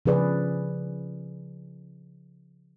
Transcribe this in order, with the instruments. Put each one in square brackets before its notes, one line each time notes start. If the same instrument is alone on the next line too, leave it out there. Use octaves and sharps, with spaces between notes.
[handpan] C#3 F3 G#4 B4 D5